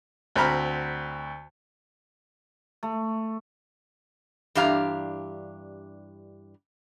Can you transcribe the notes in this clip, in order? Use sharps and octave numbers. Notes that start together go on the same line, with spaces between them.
D2 C4 A#5 B5 F6
A3
G2 E3 D4 G4 F5 A#5